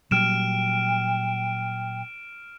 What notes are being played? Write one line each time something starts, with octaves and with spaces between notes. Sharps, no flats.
A#2 F#3 G3 G5 F6 D7 E7